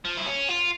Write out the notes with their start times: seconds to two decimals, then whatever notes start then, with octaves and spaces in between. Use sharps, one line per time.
0.05 F3
0.17 E4
0.26 C#4
0.49 F4